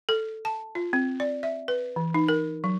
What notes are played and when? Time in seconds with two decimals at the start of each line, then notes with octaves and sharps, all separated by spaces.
0.09 A4
0.45 A5
0.75 F4
0.93 C4
1.20 D5
1.43 E5
1.68 B4
1.96 E3
2.14 D#4
2.28 A#4
2.64 F#3